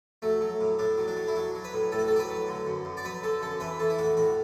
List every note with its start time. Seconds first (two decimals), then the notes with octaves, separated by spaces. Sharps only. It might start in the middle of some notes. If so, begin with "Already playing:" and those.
0.22 F#3 A3
0.41 F#3
0.61 A2
0.79 A2 D4
0.98 F#3
1.08 D4
1.16 F#3
1.28 E4
1.35 F#3 D4
1.55 F#3
1.64 B4
1.74 A2
1.92 A2 A4
1.99 F#4
2.08 F#3 A4
2.16 D5
2.19 B4
2.29 F#3
2.48 D3
2.66 F#2
2.85 F#2
2.97 D5
3.05 F#3 B4
3.23 D3 A4
3.42 F#2 A4
3.60 E3 B4
3.79 E3 A4
3.90 E4
3.98 A2 F#4
4.17 A2 F#4